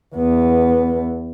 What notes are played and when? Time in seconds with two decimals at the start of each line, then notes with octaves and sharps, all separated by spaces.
0.16 E2 B3